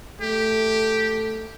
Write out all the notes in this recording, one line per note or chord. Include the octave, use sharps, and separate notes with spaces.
A3 G4